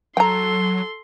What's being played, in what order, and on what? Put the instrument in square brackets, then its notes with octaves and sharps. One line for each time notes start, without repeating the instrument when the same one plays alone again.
[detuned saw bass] F#3 [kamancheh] A4 [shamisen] G5 A#5 [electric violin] C6